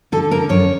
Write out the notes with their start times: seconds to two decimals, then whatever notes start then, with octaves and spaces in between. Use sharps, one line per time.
0.12 D3 A4
0.31 D3 A#4
0.49 F#2 C#5